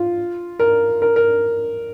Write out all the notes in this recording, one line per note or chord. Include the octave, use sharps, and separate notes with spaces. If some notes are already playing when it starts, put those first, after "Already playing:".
Already playing: F4
A#4
A#4
A#4